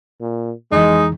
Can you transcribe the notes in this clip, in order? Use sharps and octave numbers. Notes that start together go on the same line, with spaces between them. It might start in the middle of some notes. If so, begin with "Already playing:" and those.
A#2
F2 E3 G#3 D#4